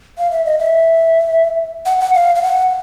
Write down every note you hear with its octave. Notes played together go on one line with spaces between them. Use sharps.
F5
E5
D#5
E5
F#5
F#5
F5
F5
F#5